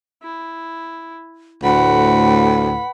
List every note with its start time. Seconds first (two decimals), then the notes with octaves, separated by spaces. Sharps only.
0.22 E4
1.63 D2 A2 B4 F#5 B5